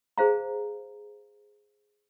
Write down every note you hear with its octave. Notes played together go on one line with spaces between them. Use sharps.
G#4 C5 F5 A#5